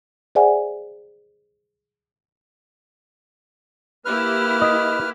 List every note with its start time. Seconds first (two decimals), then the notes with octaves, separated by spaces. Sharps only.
0.35 G#4 C5 D5 E5 F#5 G#5
4.05 A#3 E4 G4 B4 F6
4.62 D#5